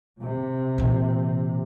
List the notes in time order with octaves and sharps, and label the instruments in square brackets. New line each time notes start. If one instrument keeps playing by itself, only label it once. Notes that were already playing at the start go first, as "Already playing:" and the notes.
[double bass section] C3
[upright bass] A#2 E3